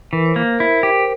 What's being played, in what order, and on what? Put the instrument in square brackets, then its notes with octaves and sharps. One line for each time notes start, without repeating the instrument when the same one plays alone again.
[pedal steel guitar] E3 [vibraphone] A#4
[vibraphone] C5
[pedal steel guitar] A#3 [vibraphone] A#4
[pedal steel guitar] E4 [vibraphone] C5
[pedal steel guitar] G4
[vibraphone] C5